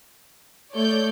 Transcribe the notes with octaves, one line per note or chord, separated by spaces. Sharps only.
A3 C#5 D5 G6